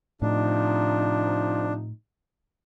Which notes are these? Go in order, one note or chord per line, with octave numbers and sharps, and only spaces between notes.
A2 C3 F3 D4 D#4